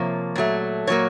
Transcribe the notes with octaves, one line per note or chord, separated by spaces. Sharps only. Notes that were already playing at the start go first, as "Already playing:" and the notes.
Already playing: C3 F3 A#3 C#5
A#2 F#3 A3
A#2 F#3 A#3 C#5